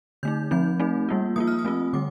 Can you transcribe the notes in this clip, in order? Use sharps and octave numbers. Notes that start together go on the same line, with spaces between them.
D3 A3 D#4 G6
F3 C4 D#4 G6
A3 C4 D#4
G3 A#3 F4
F3 A#3 F4 D#6
F6
D#6
A3 C4 F4
D3 G3 D6